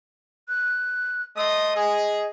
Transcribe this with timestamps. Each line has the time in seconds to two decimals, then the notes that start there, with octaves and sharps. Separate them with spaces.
0.49 F#6
1.37 A3 D#5 C6 D#6
1.75 G#4